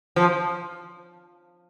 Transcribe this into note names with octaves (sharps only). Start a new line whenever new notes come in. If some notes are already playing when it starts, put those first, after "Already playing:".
F3